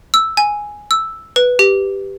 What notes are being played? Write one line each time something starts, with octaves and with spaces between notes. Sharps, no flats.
E6
G#5
E6
B4
G4